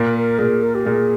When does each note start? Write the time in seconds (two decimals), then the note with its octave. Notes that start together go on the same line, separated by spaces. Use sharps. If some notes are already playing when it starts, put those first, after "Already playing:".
Already playing: A#2 A#3
0.15 A#4
0.38 A#2 A#3 G#4
0.62 A#4
0.74 G4
0.85 A#2 A#3 G#4